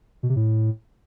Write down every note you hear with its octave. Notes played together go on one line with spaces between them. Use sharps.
B2
C3
A2